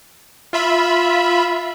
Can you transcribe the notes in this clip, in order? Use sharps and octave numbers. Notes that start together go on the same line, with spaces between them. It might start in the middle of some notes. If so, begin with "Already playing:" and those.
F4 E5 B5